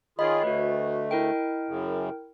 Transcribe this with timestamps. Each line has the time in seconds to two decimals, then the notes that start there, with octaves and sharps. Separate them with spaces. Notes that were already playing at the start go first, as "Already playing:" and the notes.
0.19 D#3 F4 G#4 C#5 D#5 F5 B5
0.43 D2 A3 F#4 B4
1.11 E4 A#4 G5
1.68 F#2 C#3